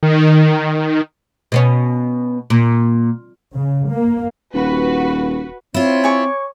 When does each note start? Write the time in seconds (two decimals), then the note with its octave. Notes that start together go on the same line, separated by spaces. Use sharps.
0.03 D#3
1.52 B2 B3 C#4
2.50 A#2
3.55 C#3
3.91 A#3
4.54 D#1 F#4 B4
5.74 C4 E4 F4 C#5
6.04 G#5 C#6 D6